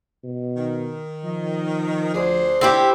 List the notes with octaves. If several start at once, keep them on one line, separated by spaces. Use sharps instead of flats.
B2
D#3
F3 D#5
D2 D4 G#4 C5
D3 A3 C4 E4 G4